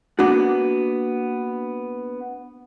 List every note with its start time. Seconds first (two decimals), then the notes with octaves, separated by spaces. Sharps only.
0.19 A#3 B3 D4 F#4